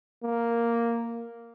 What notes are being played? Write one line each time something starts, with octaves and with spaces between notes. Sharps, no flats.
A#3